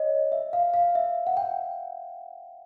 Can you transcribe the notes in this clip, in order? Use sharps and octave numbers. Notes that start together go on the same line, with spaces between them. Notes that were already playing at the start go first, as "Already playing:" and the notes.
Already playing: C#5 D#5
E5
F5
F5
E5
F#5
G5